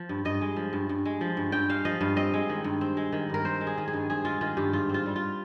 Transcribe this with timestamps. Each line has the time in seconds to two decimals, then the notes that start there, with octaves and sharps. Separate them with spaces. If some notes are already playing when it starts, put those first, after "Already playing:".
Already playing: F3
0.09 G2
0.25 G2 D#5
0.41 G#3
0.56 F3
0.73 G2
0.89 G2
1.05 G#3
1.21 F3
1.37 G2
1.52 G2 G5
1.69 G#3 F5
1.85 F3 D#5
2.01 G2 F5
2.16 C4 D#5
2.34 G#3
2.49 D#3
2.64 G2
2.81 C4
2.97 G#3
3.12 D#3
3.30 G2 A#4
3.44 C4 C5
3.61 G#3
3.67 G#4
3.78 D#3
3.88 G#4
3.93 G2
4.10 C4 G#4
4.25 G#3 F4
4.41 D#3 F4
4.57 G2 G4
4.73 G#2 F4
4.89 C4 F4
5.06 G3
5.16 F4